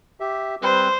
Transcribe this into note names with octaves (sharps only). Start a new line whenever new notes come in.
G4 E5
G3 C4 B4 C5